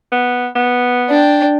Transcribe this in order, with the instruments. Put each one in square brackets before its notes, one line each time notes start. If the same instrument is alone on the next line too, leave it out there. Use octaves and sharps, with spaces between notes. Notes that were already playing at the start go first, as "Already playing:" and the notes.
[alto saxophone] B3
B3
[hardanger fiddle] D4 G5